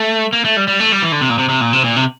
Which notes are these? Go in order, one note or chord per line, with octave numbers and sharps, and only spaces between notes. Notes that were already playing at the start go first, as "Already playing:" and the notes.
Already playing: A3
A#3
A3
G3
G3
A3
G3
E3
D3
C3
A#2
C3
C3
A#2
C3
A#2
C3